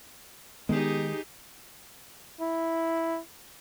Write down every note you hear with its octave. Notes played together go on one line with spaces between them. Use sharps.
D#3 G#3 B3 D#4 G4 G#4
E4